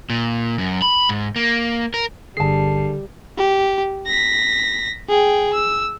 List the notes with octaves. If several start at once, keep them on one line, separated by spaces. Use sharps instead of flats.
A#2
F#2
B5
G#2
A#3
A#4
G1 D3 G3 G#4 A5 C7
G4
A#6 B6
G#4 G5
E6